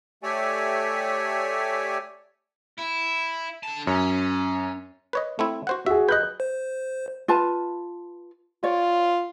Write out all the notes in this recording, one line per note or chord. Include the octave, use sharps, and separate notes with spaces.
A3 G4 C#5 D5 E5 G#5
E4
D3 A5
F#2 C#4
B4 C#5 D#5
A3 C4 E4
F#4 C5 F#5
F#4 G#4 E5
B4 D#5 F#6 G6
C5
F4 B4 A5
F4 C#5 D5